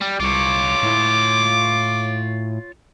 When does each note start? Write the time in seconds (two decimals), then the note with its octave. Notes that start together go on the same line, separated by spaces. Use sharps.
0.02 G3
0.20 C2 F4 C#5 D6
0.83 A2